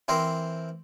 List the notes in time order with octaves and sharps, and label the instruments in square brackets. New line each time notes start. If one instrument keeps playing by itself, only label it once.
[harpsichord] E3 C4 A#4 C5